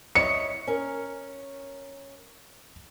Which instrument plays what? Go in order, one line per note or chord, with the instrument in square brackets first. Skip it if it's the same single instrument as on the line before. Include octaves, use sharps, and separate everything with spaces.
[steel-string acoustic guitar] E4 C#5 D#5 [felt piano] C#7
[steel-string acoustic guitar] C#4 A#4